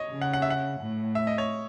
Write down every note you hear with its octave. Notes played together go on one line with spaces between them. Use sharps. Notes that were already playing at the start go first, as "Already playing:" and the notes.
Already playing: C#5 D#5
C#3
F#5
F#5
E5
F#5
A2
E5
D#5
C#5